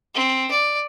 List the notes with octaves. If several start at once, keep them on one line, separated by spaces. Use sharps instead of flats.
C4
D5